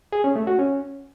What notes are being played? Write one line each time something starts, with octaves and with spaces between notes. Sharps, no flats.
G#4
C#4
A3
F#4
C#4